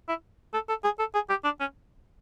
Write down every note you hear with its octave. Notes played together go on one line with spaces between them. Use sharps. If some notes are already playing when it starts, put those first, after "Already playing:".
E4
A4
A4
G#4
A4
G#4
G4
D4
C#4